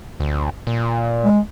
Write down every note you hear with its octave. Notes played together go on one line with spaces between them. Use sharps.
D2
A#2
G#3